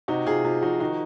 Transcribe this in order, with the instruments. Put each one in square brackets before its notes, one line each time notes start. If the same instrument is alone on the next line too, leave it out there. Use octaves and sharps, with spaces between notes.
[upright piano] C3 D#4 F#4
C3 F4 G#4
C3 F4
F3 D#4 F#4
D#3 D#4 F#4